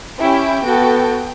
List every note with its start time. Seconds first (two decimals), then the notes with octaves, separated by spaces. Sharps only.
0.19 C#4 E4 G4 G5
0.64 B3 F#4 A4